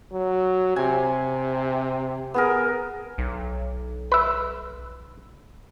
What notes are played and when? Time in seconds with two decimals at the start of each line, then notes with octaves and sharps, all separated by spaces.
0.13 F#3
0.76 C3 G#5
2.34 B3 G#4 A#4
3.18 B1
4.12 B4 E5